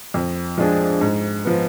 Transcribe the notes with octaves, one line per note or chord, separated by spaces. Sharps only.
F2
F3 G#3 D4 G#4
G#2
F3 B3